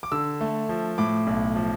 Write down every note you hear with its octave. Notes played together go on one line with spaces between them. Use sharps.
D6
D3 E6
A3
F3
A2 D6
B1
F3